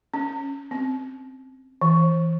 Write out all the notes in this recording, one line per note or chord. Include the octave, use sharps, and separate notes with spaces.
C#4
C4
E3